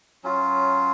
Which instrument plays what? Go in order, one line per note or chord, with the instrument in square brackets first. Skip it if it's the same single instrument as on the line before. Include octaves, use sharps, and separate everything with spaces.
[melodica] F#3 C#4 F4